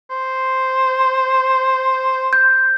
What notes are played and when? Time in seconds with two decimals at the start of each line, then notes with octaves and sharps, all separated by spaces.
0.10 C5
2.33 G6